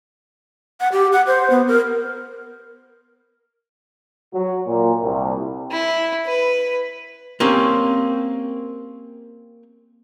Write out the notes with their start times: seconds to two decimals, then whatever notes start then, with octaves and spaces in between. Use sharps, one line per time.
0.80 F#5
0.92 G4
1.13 F#5
1.27 C5
1.50 B3
1.68 A#4
4.33 F#3
4.67 A#2
5.01 C2
5.72 E4
6.26 B4
7.40 A#3 C4 C#4 G4